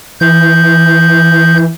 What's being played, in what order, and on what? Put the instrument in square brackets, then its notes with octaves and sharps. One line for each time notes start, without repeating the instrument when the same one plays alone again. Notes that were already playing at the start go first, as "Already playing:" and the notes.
[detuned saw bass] E3 [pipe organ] G6